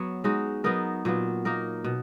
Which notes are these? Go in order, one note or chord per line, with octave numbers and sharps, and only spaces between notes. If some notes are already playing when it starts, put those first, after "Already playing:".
Already playing: F#3 B3 C#5
G#3 D#4 F#4
F#3 B3 D#4 A#4
A#2 F#3 B3
A#3 D#4 A#4
B2